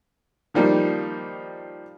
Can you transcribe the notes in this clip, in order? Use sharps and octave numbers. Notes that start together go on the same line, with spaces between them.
D#3 F3 G3 A#3 D#4